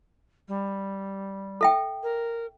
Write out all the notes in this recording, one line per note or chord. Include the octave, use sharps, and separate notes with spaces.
G3
A4 E5 G5
A#4